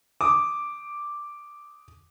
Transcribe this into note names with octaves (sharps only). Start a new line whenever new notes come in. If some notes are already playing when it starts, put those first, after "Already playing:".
D6 D#6